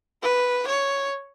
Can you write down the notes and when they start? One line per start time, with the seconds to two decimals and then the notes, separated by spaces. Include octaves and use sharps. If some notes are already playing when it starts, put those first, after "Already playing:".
0.22 B4
0.67 C#5